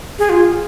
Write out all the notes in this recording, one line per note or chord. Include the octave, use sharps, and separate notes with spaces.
G#4
F4